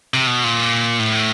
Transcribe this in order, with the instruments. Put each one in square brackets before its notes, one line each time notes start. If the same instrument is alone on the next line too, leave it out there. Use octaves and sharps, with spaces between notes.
[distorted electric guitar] C3
B2
A#2
A2